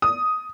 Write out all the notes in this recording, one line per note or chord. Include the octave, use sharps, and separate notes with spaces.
D#6